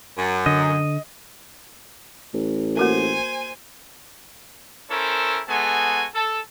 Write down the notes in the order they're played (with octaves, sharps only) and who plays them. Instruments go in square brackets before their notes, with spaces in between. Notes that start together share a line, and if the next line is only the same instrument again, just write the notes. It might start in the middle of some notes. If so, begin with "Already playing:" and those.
[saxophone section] F#2
[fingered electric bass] D3 [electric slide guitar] D#5
[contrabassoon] A1
[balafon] A#3 F#4 A#4 [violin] C5 G#5
[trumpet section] C#4 E4 A4 A#4 C5
G#3 B3 F#4 A4 G#5
A4